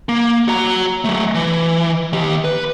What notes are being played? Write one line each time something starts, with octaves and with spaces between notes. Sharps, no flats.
A#3
F#4 A#5
F#3 A3
E3
D#3 G4
B4